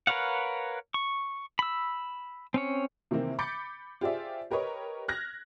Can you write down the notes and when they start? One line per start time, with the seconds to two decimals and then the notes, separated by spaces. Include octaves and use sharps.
0.07 A#4 B4 C#5 F5 F#5
0.94 C#6
1.59 B5 E6
2.54 C4 C#4 C#5
3.11 C3 D#3 E3 A#3 C4
3.39 B5 D6 G6 A6 B6 C#7
4.01 F4 G4 G#4 C5 D5 E5
4.51 G4 A#4 B4 C#5 D#5
5.08 F6 F#6 G#6 A#6